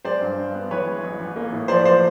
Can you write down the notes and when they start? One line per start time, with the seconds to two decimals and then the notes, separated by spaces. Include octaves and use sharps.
0.05 G#3 C5 D5
0.21 G2
0.38 G2
0.55 B3
0.70 E3 B4 C#5
0.86 G#3
1.04 A1
1.19 A1
1.36 A#3
1.52 A2
1.68 F3 C5 D5
1.85 F3 C5 D5